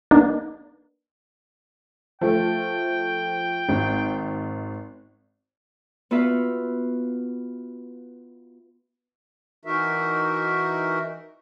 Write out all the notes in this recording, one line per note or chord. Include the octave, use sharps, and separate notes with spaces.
A#3 B3 D4 D#4
F3 A3 G5
G#1
B3 F4 F#4 B4 E5 F5
E3 D#4 F#4 A#4 E5